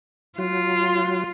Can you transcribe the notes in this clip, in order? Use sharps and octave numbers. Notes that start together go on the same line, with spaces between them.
F#3 F4